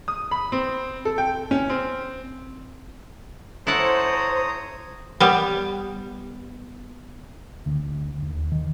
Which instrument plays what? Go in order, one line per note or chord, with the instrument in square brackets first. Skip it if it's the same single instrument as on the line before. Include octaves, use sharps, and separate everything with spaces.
[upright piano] D#6
B5
C4
A4
G5
C#4
C4
[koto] E4 A4 F#5 [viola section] C5 [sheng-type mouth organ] C#5 A#5 D#6
[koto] G3 B3
[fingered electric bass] D2
D#2
D#3